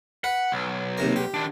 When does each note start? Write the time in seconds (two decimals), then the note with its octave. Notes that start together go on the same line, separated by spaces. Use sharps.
0.24 B4 F#5
0.52 B1
0.98 D#2 C3 A#4
1.16 G4
1.34 D#3 D4